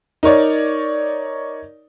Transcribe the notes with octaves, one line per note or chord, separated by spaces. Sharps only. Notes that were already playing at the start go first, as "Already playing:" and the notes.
D#4 A#4 C#5 D5